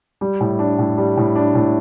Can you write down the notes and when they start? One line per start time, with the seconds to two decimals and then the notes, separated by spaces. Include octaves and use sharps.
0.21 G3
0.41 A2
0.59 D4
0.79 A2
0.98 G3
1.17 A2
1.36 D4
1.55 A2